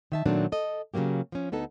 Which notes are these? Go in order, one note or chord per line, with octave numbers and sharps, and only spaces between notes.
D#3 E5 A5
A#2 D#3 F#3 A3 C4 D4
A4 D#5
C#3 E3 F#3 A#3 G4
F3 C#4
D2 B3 D#4 A4